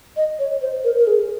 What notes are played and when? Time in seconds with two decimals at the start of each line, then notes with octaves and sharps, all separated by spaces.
0.17 D#5
0.39 C#5
0.62 C5
0.84 A#4
0.99 A#4
1.07 G#4